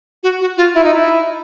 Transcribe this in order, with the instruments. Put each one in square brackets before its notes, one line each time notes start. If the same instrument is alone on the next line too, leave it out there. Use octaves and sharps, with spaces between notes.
[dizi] F#4
F#4
F4
E4
D#4
E4